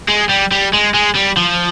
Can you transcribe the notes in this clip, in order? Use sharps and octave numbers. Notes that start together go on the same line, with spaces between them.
G#3
G3
G3
G#3
G#3
G3
F3